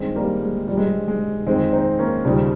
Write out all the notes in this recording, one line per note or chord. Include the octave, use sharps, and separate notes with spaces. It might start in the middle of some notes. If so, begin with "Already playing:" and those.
Already playing: G2 D#3 G#3 C4
G3 A#3
G#3
G2 F3 G3
G#3
G3
G#3
F2 D#3 G#3 C4
C4 D#4
A#3 C#4
D#2 C#3 F3 G3